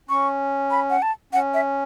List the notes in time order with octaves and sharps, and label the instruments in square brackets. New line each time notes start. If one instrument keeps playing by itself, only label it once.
[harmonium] C#4 [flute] C#6
[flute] B5
F#5
A5
[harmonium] C#4 [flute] F#5
[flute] E5